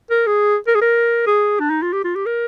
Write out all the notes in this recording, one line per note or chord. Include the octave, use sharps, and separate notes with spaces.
A#4
G#4
A#4
G#4
A#4
G#4
D4
D#4
F4
G4
F4
G4
A#4